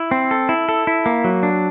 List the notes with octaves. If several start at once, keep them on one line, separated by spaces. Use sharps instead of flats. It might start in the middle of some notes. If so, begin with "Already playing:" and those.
Already playing: E4
C4
A4
E4
A4
E4
A#3
F#3
D4